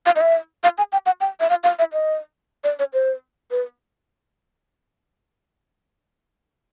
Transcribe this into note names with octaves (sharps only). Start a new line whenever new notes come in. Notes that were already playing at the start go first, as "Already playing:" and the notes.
F5
D#5
E5
F5
G#5
G5
F#5
G5
E5
F5
F5
E5
D#5
D5
C#5
C5
B4